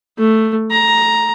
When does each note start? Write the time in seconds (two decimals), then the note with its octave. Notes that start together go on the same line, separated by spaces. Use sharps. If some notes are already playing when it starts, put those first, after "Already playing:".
0.18 A3
0.72 A#5